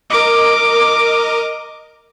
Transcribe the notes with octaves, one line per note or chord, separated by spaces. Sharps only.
A#4 D#5 D6